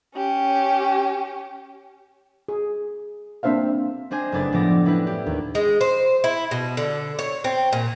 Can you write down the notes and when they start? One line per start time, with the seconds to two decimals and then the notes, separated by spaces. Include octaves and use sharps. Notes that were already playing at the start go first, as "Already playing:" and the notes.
0.15 C#4 G4
2.48 G#4
3.43 A#3 C4 D4 C5 E5 F5
4.11 C4 D4 C5 D#5 G#5
4.32 F#1 A3 D4 B4 A6
4.52 A2 F3 B3 D5 D6 A#6
4.85 C#4 D4 E4 G4 B4
5.07 D4 G4
5.26 D#2
5.55 G#3
5.81 C5
6.24 E4
6.51 B2
6.77 D3
7.19 C#5
7.44 C4
7.73 A#2